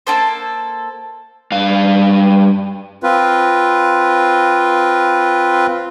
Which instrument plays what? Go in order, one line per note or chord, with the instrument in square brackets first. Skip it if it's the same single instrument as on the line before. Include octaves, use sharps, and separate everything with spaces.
[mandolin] A#3 E4 A4 C5
[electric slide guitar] G2 F5
[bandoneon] C4 F4 B4